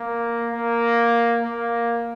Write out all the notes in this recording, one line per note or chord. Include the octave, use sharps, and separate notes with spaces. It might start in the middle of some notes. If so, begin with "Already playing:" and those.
Already playing: A#3
A#3
A#3